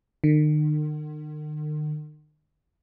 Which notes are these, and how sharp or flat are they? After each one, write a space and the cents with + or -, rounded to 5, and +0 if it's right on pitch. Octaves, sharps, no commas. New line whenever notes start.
D#3 -45